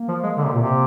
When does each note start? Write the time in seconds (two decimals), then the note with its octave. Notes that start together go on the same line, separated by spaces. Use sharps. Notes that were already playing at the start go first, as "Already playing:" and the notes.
Already playing: A#3
0.08 F3
0.23 G#3
0.37 D3
0.45 C3
0.54 A#2
0.62 C3